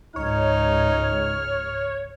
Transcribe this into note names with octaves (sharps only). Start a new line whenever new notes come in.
C#2 G#2 D#4 C#5 F6